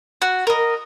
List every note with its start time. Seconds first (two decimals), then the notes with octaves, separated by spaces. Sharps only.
0.22 F#4
0.47 A#4 D#5